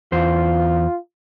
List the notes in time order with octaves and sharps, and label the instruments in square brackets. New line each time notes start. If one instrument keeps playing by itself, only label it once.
[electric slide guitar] E2 C5 [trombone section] F4